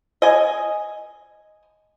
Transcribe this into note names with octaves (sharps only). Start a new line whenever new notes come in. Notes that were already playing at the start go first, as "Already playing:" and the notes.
D#5 G#5